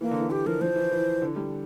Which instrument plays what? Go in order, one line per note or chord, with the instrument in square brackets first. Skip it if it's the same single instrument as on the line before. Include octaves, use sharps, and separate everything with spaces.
[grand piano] E3 [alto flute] A#3
[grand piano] D3
E3
[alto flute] G4
[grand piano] F3 [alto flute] A#4
[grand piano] F3 [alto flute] C5
[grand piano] E3
E3
D3
G3